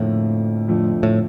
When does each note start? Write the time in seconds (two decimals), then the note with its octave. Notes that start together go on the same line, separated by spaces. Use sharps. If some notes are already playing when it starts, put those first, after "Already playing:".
Already playing: F2 A2 D3 F3 A#3
0.68 F2 D3 F3 A3
1.03 A2